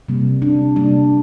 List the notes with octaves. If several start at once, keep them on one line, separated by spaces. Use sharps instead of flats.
C3 G3 A#3
D4
C3 G3 A#3 D4